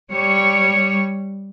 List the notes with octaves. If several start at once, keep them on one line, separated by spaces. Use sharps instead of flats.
G3 C#5